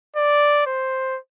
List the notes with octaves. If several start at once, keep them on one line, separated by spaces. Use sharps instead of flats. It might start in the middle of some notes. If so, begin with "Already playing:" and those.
D5
C5